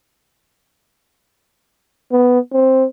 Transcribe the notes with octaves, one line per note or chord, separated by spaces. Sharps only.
B3
C4